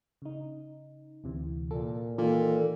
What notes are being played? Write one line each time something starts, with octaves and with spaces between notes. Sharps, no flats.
C#3 D#4
D2 C3 E3
A#2 A#3 A4
A#2 D#3 E3 A4